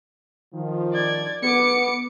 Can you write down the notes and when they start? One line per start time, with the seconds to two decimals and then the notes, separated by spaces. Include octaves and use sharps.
0.54 D#3 F3
0.93 D5 G#6
1.43 B3 D6 C#7